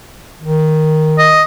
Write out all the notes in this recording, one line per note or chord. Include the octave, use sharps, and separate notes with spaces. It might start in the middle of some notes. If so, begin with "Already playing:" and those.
D#3
D#5